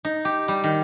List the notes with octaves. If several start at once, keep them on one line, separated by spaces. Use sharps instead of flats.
D#4
G4
G3
D#3